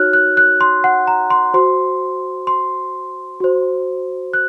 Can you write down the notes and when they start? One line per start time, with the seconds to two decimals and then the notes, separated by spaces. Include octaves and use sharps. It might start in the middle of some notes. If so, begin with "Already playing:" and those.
Already playing: D#4 F#4 C#5 F6 F#6
0.13 F#6
0.37 F#6
0.61 C6
0.84 F#5
1.07 A#5
1.30 C6
1.54 F#4 C5 C6
2.47 C6
3.40 F#4 C5
4.33 F#6